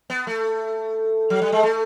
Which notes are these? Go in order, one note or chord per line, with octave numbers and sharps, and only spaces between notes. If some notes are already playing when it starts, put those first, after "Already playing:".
B3
A3
F#3
G3
G#3
A3